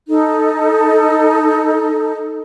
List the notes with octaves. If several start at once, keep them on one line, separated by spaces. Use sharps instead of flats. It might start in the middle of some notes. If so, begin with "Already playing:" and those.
D#4 A4